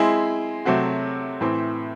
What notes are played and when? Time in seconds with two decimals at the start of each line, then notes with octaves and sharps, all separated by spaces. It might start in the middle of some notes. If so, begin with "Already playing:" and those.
Already playing: G#3 C4 E4 G#4
0.65 C3 F#3 A3 C4 F#4
1.41 A2 E3 C4